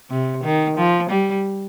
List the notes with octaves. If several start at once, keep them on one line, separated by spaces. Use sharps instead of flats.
C3
D#3
F3
G3